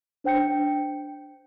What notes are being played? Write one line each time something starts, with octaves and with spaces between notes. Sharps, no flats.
D4 C5 G5 G6 C#7